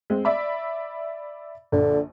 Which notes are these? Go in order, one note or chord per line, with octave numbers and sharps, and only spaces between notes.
G#3 C4
D5 E5 B5
A#1 D3